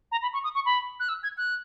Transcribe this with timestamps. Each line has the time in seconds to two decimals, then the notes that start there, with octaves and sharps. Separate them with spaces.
0.11 A#5
0.22 B5
0.33 C#6
0.43 D#6
0.54 C#6
0.65 B5
0.99 F#6
1.08 E6
1.23 G#6
1.37 F#6